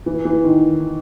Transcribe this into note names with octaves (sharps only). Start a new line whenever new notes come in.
E3
E3
D#3